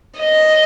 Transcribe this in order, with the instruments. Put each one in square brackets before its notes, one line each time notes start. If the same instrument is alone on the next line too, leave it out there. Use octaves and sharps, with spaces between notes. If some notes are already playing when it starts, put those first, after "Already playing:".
[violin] D#5